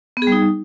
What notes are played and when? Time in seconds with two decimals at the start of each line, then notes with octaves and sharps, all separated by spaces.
0.17 B3
0.22 G#4
0.27 G3
0.32 D#4